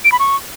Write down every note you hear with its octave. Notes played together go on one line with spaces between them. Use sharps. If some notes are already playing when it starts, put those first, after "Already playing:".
D7
B5
C#6